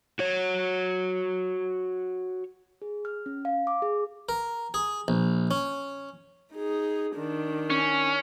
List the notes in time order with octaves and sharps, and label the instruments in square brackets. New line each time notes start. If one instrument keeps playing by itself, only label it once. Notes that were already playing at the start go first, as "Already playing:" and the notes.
[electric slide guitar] F#4 C#5
[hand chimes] G#4
F6
C#4
F5
D6
G#4
[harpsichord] A#4
G#4
A#1
C#4
[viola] D#4 G#4
D#3 D4
[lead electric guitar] C#4